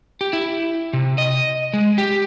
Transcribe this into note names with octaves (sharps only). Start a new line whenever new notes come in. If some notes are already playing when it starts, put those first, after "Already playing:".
G4
E4
C3
D#5
G#3
G4